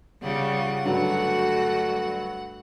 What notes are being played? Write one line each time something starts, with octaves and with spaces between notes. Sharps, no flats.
C#3 G3 F4 G4 F#5
G2 D3 F#3 G3 A3 F#4